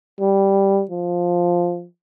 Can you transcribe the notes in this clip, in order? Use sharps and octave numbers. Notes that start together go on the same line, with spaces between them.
G3
F3